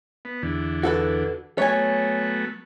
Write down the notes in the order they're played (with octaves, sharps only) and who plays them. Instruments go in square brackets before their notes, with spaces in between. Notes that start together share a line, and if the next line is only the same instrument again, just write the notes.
[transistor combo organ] B3
E2 D3
[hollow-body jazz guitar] F#4 A4 B4
[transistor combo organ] F#3 A3 B3 [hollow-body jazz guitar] C#5 G#5